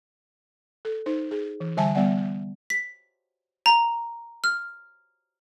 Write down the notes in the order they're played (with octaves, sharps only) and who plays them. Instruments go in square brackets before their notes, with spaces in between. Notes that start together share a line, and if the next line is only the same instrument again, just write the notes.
[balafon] A4
D#4 C5
G#4
E3
D3 G3 E5 G#5 A5
G3 B3 D5 F#5
[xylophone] B6
A#5
F6